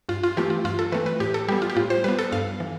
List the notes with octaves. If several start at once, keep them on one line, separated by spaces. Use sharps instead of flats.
G2 F4
F4
E3 A3 C4 G4
F4
G2 F4
A4
E3 A3 C4 B4
B4
A2 G4
A4
G3 B3 G4
F4
G4
A2 F4
C5
G3 B3 B4
A4
G2 F5
E3